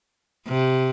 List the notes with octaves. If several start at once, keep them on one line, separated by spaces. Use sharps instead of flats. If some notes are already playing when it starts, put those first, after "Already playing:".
C3